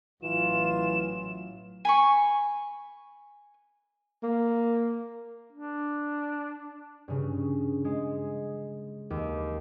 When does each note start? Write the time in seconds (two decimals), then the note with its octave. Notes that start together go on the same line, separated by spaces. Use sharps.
0.23 A1 E3 F#3 F4 E7
1.85 G#5 B5 C#6
4.23 A#3
5.53 D4
7.08 G2 C#3
7.85 G#3
9.10 D#2